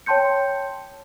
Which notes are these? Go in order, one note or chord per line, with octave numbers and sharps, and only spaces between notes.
C#5 G5 A5 C6 G6 C#7